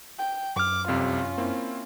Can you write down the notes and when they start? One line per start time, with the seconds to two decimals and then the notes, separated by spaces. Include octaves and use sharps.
0.19 G5
0.56 F#2 D6 F6
0.88 C2 F2 C3 C#4 F4
1.38 A#3 C4 E4